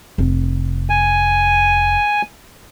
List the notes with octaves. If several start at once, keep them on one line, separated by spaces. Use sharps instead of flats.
F1
G#5